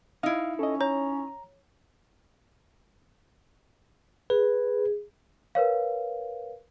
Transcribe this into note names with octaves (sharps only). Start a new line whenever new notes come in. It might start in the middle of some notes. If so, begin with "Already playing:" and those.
D#4 E4 F5
C#4 A4 D#5
C#5 A#5
G#4 B4
A#4 B4 C#5 F5